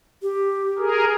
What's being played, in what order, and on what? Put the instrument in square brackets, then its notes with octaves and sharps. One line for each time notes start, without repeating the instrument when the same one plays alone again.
[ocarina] G4
[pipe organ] G#4 A#4